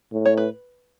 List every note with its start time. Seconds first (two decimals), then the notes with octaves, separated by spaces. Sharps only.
0.13 A2
0.25 C#5
0.37 B4